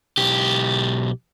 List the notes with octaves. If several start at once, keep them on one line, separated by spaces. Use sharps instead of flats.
B1 G4